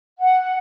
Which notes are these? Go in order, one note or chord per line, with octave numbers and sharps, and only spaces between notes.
F#5